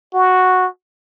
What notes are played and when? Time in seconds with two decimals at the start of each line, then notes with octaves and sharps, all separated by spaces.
0.14 F#4